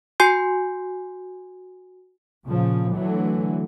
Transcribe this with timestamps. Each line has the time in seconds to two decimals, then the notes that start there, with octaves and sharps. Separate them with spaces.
0.20 F#4 G#5 C6 G6 C7
2.45 A#2 C#3 F3
2.96 D3 E3 F#3 A3